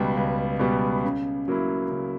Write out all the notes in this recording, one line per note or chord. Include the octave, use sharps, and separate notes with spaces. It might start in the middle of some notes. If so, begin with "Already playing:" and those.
Already playing: C#2 B2 G3 B3
C#2
B2 G3 B3
C#3
F#3 A#3 E4
C#3